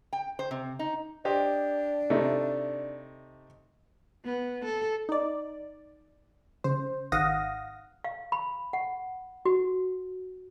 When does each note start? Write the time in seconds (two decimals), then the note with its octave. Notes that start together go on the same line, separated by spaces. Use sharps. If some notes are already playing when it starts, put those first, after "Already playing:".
0.13 G5
0.39 C5
0.51 C3
0.79 D#4
1.25 D4 G4 C5 D#5
2.10 C3 A3 D#4
4.25 B3
4.65 A4
5.09 D#4 D5
6.64 C#3 C5
7.12 G#1 D#3 F5 F#5 D#6 A#6
8.04 F5
8.32 B5
8.73 F#5
9.45 F#4